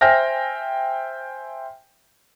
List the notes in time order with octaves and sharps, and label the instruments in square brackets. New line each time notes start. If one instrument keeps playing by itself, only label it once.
[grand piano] C5 E5 G5 G#5 F6 A#6